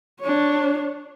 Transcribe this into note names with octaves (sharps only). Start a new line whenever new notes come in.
D4 C#5